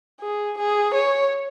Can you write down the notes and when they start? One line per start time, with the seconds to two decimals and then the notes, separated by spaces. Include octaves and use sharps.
0.21 G#4
0.57 G#4
0.94 C#5